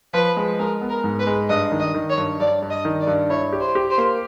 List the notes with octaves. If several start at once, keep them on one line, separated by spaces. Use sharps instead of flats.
F3 B4
G#3
G#3 A#4
B3
A#4
G#2
B4
G#3
G2 D#5
D#3
D#5
D#3
C#5
G2
G2 D5
G2
D#5
D#3
D5
G2
E4 C#5
G4
C5
G4
C5
A#3